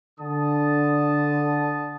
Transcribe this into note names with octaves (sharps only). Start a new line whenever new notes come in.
D3 A5 D#6